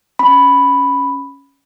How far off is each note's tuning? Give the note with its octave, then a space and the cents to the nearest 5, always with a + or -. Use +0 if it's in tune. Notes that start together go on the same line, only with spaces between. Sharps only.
C#4 +0 B5 +0